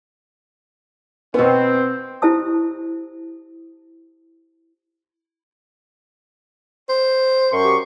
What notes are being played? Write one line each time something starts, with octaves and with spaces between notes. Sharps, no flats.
B2 B3 C4
E4 G4 C5 A5 D#6
C5
F#2 C6 C#6
G4